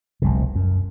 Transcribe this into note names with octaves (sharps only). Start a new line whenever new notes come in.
F1 C2 B2
F#2